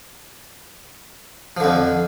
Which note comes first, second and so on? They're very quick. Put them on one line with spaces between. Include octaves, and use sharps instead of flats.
F3 D3 F2